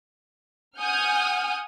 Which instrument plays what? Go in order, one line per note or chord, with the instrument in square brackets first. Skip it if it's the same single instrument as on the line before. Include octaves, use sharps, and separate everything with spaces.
[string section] F#5 G#5 D#6 F6 G6